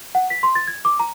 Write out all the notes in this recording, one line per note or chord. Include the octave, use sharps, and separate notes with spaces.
F#5
B6
C6
A6
G#6
D6
A#5